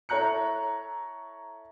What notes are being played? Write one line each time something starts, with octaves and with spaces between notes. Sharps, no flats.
E4 A4 C#5 A#5 F#6 C#7